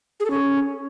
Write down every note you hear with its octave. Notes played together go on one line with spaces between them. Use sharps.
G#4
A4
C#4